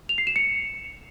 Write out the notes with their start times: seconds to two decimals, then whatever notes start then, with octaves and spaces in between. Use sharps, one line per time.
0.09 F7
0.18 C7
0.27 E7
0.36 C#7